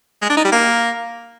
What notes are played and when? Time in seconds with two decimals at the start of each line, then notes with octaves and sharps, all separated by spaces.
0.22 G#3
0.29 D4
0.37 D#4
0.44 G3
0.52 A#3